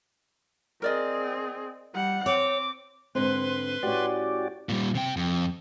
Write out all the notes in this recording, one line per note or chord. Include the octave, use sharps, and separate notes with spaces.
C4 G#4 A#4 D5 D#5
G3 F#5
C4 C#5 D6
G#2 D3 C4 B4 C6
A2 C#4 F#4 G4 D5
A#2 G3
C3 G5
F2